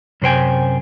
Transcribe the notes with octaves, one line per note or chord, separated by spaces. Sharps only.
F#2 C3 C5 G5 G#5